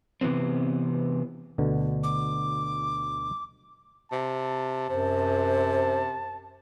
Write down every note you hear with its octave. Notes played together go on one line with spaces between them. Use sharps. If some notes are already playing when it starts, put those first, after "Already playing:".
C3 E3 G3 B3 C4
D2 B2 D3
D6
C3 A5
F#2 C3 C5